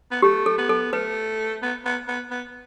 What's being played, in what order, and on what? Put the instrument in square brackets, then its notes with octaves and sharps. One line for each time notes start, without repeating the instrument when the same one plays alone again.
[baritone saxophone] B3
[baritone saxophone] A3 [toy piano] G4
[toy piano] A4
[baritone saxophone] B3
[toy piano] A4
[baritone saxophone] A3 [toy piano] B4
[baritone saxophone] B3
B3
B3
B3